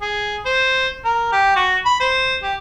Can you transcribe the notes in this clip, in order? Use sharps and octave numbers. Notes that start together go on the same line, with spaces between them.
G#4
C5
A#4
G4
F#4
B5
C5
G4